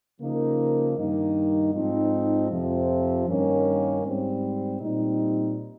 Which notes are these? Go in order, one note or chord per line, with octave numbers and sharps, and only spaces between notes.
C#3 F3 A#3 D#4
G2 D#3 A#3 D#4
G#2 F3 C4 D#4
F2 C3 F3
G2 D#3 A#3 C#4
G#2 G3 C4
A#2 G3 C4 D#4